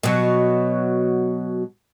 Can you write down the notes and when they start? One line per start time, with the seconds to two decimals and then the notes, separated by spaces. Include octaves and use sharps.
0.03 B2 F#3